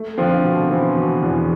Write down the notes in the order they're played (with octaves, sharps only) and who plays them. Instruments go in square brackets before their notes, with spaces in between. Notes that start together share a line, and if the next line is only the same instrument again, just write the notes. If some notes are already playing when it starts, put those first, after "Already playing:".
Already playing: [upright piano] A3
[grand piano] D3 F3 [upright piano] C4
[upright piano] B2
[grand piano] E3 [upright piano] C4
[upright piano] B2
E2